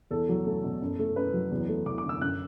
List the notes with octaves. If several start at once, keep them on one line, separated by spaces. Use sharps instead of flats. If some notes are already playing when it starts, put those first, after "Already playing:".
E2 A4
F#3
A3
B2
F#2
A3
F#2 B4
F#3
E2
A3
E2 D6
D6
D3
E6
F#2 F#6